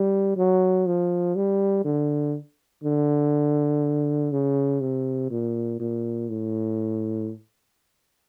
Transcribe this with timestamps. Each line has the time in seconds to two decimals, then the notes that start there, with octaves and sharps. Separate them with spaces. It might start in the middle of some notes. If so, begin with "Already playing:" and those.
Already playing: G3
0.37 F#3
0.87 F3
1.36 G3
1.85 D3
2.84 D3
4.32 C#3
4.81 C3
5.31 A#2
5.80 A#2
6.29 A2